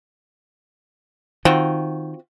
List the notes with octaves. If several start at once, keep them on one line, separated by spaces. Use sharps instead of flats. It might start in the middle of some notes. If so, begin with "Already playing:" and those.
D#3 C4 F4 F#4